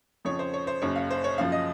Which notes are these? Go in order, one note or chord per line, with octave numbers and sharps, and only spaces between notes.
F2 C#3 F3 C#5
C5
C#5
C5
F#1 F#2 C#3 C#5
F5
C5
C#5
F#1 F#2 C#3 F3 F5
D#5